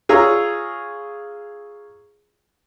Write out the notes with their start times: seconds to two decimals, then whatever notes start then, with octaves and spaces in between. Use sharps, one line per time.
0.09 F4 G#4 C#5 A#5 E6